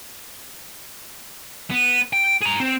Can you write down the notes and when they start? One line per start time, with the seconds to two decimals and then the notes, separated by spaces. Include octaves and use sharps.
1.70 B3
2.13 G5
2.41 G#4 A#5
2.60 C4